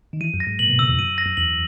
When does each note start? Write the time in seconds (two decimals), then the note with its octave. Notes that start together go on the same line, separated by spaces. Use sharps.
0.13 D#3
0.21 E3 D#7
0.34 F#2
0.40 A#6
0.47 G#2
0.59 A#2 F#7
0.69 B2
0.79 C#3 E6
0.89 E2
0.99 F#2 D#7
1.18 A#6
1.26 F#2
1.37 E2 F#7